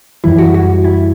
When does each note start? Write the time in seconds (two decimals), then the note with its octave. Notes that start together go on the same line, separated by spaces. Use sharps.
0.24 F#2 E3 G3 E4
0.38 F#4
0.54 F#4
0.84 E4